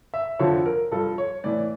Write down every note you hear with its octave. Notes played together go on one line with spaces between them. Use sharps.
E5
F2 D3 F3 C#5
A#4
G2 F3 A4
C#5
A2 E3 D5